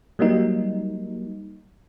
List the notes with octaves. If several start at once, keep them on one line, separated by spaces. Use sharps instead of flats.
F#3 G3 A#3 D#4